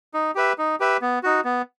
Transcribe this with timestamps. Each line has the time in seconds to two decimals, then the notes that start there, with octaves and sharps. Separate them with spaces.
0.14 D#4
0.35 G4 B4 E5
0.58 D#4
0.80 G4 B4 E5
1.02 B3
1.23 D#4 F#4
1.45 B3